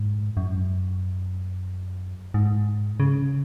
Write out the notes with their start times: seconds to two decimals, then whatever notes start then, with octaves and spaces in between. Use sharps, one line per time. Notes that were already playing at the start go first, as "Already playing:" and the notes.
Already playing: G#2
0.37 F#2
2.34 G#2
3.00 C#3